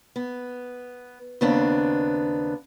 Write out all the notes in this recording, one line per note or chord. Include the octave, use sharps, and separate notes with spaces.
B3
D#2 C#3 B3 C4 D4